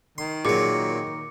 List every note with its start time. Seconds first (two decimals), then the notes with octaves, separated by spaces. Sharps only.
0.18 D#3 C6
0.45 A#2 F#3 G#4 D6 C#7